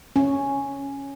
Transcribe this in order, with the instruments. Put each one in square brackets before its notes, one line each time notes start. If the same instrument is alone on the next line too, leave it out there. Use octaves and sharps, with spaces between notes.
[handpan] C#4